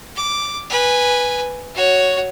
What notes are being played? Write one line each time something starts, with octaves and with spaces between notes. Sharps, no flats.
D6
B4 G#5
F#4 C#5